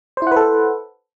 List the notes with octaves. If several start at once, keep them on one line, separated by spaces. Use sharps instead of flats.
E4 A4 B4 C5 F#5